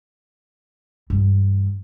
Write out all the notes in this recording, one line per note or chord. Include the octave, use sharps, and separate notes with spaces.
G2 E3